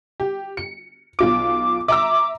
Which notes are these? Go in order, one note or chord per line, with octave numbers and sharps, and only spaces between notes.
G4
C#7
B1 F4 D6 D7
E5 A#5 D6 E6